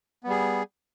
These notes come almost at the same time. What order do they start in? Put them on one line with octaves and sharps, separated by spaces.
B3 G3 G#4